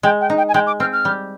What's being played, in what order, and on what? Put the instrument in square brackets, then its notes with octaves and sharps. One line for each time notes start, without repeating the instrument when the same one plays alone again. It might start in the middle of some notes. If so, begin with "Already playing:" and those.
[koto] G#3 [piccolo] G5
[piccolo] G5
[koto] D#4
[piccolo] G5
G#5
[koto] G#3 [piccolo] G5
[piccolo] D6
[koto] C4 [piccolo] F6
[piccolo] F6
[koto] G3